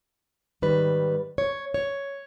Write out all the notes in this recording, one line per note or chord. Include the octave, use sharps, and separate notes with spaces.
G#2 D#3 G3 B4
C#5
C#5